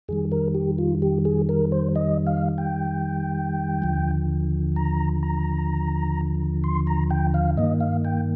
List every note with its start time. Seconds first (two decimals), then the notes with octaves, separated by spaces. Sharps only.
0.08 F2 D#3 G3 G#4
0.32 A#4
0.55 G4
0.78 F4
1.02 G4
1.25 G#4
1.49 A#4
1.72 C5
1.96 D#5
2.27 F5
2.58 G5
3.82 D#2 D3 F3
4.76 A#5
5.23 A#5
6.64 C6
6.87 A#5
7.11 G5
7.34 F5
7.57 G2 D#3 A#3 D#5
7.80 F5
8.05 G5